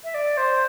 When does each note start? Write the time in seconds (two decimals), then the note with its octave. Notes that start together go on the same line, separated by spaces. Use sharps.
0.04 E5
0.14 D5
0.37 C5